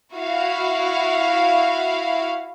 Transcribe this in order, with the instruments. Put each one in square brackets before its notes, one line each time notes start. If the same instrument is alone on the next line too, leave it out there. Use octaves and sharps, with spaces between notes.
[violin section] E4 F#4 F5